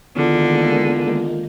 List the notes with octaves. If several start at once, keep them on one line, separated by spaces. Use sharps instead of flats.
E2 D3 D#3 G#3 A#3 F4